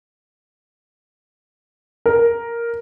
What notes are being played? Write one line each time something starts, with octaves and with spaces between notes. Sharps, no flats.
A#4